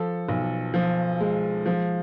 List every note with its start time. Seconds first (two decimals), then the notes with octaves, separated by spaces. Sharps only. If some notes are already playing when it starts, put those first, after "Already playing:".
Already playing: F3 A4
0.29 B1
0.74 F3
1.21 G#3
1.66 F3